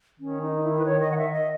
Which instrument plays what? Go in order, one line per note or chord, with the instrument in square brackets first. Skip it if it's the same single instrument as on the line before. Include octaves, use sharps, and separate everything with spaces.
[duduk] D#3 [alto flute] C#4
[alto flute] D#4
E4
B4
C#5
D#5
F#5
E5
D#5